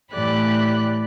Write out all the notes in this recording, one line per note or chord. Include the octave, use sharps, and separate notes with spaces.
A2 E3 G4 D5 B5 F#6